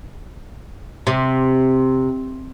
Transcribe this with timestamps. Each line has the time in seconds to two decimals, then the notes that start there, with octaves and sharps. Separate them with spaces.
1.07 C3